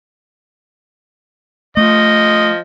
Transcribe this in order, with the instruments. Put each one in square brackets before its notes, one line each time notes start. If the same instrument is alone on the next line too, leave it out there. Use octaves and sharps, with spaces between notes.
[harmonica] F3 D#5 [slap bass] A3